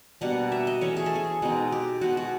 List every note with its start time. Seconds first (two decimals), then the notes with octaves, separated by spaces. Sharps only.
0.21 B2 G3 A#3 D4 F#5
0.52 E5
0.67 D#5
0.81 E3 A3 C#4 C#5
0.97 G#4
1.06 A4
1.16 G#4
1.42 B2 G#3 C4 D#4
1.72 G4
2.01 B2 G#3 B3 F#4
2.17 F#4